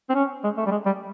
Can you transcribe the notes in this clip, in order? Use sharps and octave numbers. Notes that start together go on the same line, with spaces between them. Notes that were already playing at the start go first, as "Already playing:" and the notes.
C4
C#4
G#3
A3
G3
G#3
G3